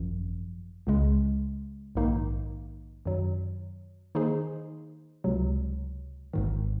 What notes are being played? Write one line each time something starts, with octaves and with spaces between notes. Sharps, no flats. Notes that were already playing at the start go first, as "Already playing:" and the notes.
Already playing: G#1 F#2 F3
C#2 C#3 G#3
A#1 G#2 D#3 A#3 D#4
F#2 D#3 F#3
D#3 A#3 D#4 G#4 C5
C#2 C3 F#3
G#1 G#2 D#3